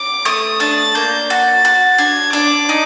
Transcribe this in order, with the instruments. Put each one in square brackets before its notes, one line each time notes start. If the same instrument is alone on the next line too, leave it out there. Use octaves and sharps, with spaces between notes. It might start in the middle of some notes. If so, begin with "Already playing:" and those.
Already playing: [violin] D6
[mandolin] A3 [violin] D#6
[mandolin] D4 [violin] A6
[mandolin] A#3 [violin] G6
[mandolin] F#4 [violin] A6
[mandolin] F#4
[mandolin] D4 [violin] G#6
[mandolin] D4 [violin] D6
[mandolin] D#4